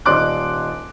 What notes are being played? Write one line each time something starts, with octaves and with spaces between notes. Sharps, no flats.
D#1 D#4 D5 C6 D6 F#6